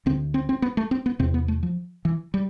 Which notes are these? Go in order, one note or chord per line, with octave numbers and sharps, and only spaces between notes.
D2 D3 C4
C4
C4
B3
A3
C4
B3
E2 C3 C4
B3
A3
F3
E3
G3